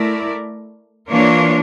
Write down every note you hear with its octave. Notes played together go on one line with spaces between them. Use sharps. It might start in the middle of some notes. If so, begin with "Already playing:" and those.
Already playing: A3 E4 A#4 D5
E3 A#3 D4 F4 C#5